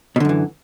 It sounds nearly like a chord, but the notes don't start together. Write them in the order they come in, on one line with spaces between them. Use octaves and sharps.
B2 D3 F#2 E3